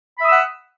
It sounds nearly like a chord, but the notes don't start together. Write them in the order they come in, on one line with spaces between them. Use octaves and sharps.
B5 E5 D#6 E6 F#5